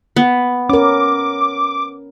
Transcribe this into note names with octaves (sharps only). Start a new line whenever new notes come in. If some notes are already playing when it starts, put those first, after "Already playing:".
B3
C#4 A#4 D6